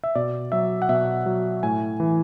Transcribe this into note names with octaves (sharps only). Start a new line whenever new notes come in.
E5
B2 D5
F#3 E5
F#5
B2 E5
F#3
A2 G#5
E3